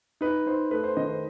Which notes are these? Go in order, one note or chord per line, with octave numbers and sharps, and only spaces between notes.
D#4 B4
D#4 C5
A3 B4
C5
D#3 D#5
C5